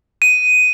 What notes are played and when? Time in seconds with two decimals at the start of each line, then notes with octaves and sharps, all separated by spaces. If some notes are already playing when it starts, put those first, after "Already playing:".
0.22 D#7